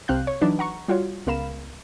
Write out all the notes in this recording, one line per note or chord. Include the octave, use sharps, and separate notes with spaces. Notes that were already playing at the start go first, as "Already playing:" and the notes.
C2 C3 C4 F5 F#6 G6
C#5
E3 F#3 D4 D#4 B4
F#5 A#5 C#6
G3 F4 F#4 C#5
C#2 B3 A#4 F5 B5 E7